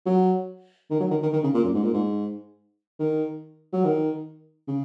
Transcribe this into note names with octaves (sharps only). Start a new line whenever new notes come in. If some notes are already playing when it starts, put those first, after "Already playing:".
F#3
D#3
F#3
D#3
D#3
D#3
C#3
A#2
F#2
G#2
A#2
G#2
D#3
F#3
D#3
C#3